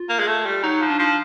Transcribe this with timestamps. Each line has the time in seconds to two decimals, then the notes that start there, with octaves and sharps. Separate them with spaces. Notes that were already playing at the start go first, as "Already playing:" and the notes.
Already playing: F4
0.09 A#3
0.19 G#3
0.27 A3
0.46 G3
0.63 F#3 D#4
0.82 F3
0.90 D4
0.99 F3